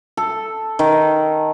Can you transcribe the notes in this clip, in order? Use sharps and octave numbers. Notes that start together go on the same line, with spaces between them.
A4
D#3